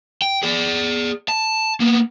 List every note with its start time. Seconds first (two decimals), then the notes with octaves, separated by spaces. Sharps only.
0.22 G5
0.43 G#4 D5
1.29 A5
1.80 A#3 B3